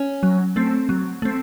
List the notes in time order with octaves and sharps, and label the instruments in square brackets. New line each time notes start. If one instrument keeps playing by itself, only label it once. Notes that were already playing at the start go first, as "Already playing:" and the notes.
Already playing: [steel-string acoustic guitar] C#4
[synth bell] F#3
A3 C4
F#3
A3 C4